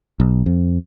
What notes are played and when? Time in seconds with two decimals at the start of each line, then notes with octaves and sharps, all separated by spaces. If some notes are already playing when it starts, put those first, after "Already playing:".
0.20 B1
0.46 F2